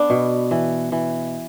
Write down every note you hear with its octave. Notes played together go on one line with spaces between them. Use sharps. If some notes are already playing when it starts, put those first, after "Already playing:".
Already playing: B3 D4
B2
E3
E3